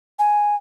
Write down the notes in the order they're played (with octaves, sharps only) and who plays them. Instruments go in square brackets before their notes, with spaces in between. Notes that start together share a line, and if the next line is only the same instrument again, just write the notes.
[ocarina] G#5